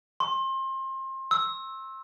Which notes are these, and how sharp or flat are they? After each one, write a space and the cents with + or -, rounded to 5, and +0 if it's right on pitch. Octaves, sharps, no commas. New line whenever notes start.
C6 +30
E6 -10